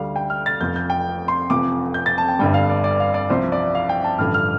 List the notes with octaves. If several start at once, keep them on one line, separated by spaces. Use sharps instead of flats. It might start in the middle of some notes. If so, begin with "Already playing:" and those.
Already playing: D2 D3 G3 F5
G5
F6
A6
F1 F2 F3 G6
G6
G5
C6
F1 F2 C3 F3 D6
G6
A6
A5
G5
G1 G2 D3 G3 G5
F5
D5
D5
F5
D5
C2 C3 F3 C5
D5
F5
G5
A5
A1 G2 D3 F3 F6
F6